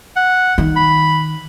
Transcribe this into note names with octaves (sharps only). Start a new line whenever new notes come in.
F#5
D#3
B5